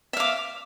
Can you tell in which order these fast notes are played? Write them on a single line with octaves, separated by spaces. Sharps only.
E5 F5 D6